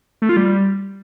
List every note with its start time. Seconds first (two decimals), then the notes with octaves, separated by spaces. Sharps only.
0.22 A3
0.29 F4
0.37 G3